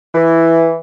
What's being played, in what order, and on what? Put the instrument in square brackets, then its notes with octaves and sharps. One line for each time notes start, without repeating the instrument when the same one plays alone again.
[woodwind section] E3